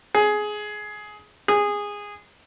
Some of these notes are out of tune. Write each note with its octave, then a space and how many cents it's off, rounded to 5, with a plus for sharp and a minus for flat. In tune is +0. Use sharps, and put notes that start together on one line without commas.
G#4 +15
G#4 -15